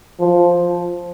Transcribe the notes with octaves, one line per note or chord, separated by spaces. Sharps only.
F3